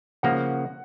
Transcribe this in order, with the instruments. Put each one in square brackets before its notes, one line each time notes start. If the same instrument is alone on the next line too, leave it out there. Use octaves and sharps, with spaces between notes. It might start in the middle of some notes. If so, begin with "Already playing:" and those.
[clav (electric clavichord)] C#3 F3 A#3 [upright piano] F#5